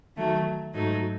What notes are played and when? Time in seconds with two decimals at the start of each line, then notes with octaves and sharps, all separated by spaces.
0.17 D#3 F#3 A3
0.74 G#2 F#3 A3 D#4